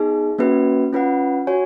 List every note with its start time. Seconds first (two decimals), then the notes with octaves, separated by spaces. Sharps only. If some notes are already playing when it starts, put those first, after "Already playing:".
Already playing: B3 D#4 G#4
0.39 A#3 C#4 F#4 B4
0.93 C#4 F4 B4 F#5
1.47 F#4 C#5 G#5